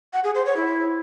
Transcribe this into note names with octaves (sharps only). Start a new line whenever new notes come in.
F#5
G#4
C5
C#5
E4